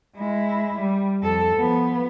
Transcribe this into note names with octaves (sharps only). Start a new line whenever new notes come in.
G#3 E4
G3
F2 A4
F3 B3